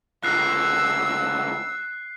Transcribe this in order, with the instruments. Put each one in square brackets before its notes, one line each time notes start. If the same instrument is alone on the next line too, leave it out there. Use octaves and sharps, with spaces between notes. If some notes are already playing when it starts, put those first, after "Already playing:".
[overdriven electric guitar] C#2 D3 [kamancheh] E6 [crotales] F#6 C7